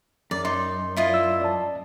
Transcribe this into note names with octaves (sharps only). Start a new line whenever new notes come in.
F#2 D5
D#4 C6
E4 F4 D#5
D5 E6
D5 A5